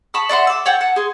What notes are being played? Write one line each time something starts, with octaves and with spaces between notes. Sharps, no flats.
A5 B5 C#6 D#6
D5 E5 F#5 C6
D6 E6
C#5 F#5 G5 A5
F#5 A5
G#4 C6